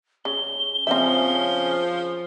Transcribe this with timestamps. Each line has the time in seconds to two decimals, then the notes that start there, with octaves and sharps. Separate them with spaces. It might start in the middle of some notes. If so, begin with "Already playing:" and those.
0.25 C#3 G7
0.87 C#3 F3 C4 C#4 E5